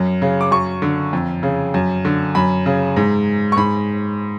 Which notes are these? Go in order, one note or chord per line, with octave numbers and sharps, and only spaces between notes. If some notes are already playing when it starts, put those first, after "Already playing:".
Already playing: F#2
C#3
D6
F#2 C#6
D3
F2
C#3
F#2
D3
F#2 B5
C#3
G#2
C#6
G#2 B5